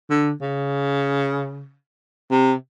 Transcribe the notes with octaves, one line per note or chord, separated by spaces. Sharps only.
D3
C#3
C3